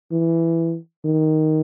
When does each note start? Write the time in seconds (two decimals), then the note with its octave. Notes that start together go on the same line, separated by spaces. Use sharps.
0.11 E3
1.05 D#3